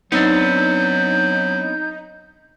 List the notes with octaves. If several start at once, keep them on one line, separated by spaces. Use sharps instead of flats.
F#3 B3 C4 D4 D#4 G6